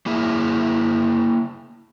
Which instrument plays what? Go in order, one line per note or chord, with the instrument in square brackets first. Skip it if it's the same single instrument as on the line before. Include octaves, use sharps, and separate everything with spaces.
[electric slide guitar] A#3 E4 G#4 E5